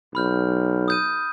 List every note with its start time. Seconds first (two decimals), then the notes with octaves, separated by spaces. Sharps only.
0.15 B1 B5 F6 G6
0.88 D#6 G6 D#7